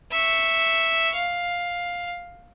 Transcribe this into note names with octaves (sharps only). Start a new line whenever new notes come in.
E5 C#6
F5